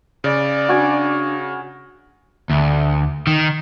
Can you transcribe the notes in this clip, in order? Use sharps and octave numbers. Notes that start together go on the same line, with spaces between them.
C#3 D5
D4 F#4 G#5
D2
D#3